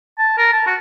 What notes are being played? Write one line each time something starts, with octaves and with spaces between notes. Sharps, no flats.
A5
A#4
A5
F#4